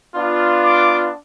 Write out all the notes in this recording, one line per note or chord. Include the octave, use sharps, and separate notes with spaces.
B3 D4 F4
D6